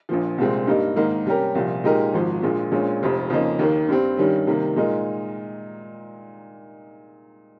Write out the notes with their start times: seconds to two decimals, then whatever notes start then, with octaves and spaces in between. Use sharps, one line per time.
0.09 A#1 A#2 F3
0.38 C2 A#2 G#3 C4
0.67 G2 G3 A#3 D#4
0.96 G#2 D#3 A#3 D#4 A#4
1.26 C3 G3 C#4 G4 A#4
1.55 C2 A#2 F3
1.84 A#2 G#3 D#4 G4 A#4
2.13 G#1 G#2 F3
2.43 A#1 A#2 G#3
2.72 A#1 A#2 G#3 C#4
3.01 F1 F2 C3
3.30 F2 C#3 F3 A#3 D#4
3.59 D#2 D#3 A#3
3.89 G2 G3 C4
4.17 G2 D#3 G3 C#4
4.47 C3 D#3 G3 A#3
4.76 A#2 G#3 D#4 A#4